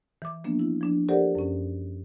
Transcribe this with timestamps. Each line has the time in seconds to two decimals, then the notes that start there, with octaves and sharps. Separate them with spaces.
0.22 E3 D6
0.44 F3 A#3 B3 D4
0.59 E4
0.81 F3 D4
1.09 G4 A4 A#4 C5 D5 F#5
1.35 F#2 C#4